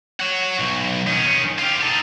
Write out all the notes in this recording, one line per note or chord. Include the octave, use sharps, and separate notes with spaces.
C#5 F#5
B1
D#3 C#4
F4 G4
D#4 A4